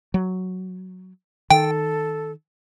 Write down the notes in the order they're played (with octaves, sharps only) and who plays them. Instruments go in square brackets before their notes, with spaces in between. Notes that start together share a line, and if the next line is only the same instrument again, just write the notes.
[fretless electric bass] F#3
[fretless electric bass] D#3 [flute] A4 [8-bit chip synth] G5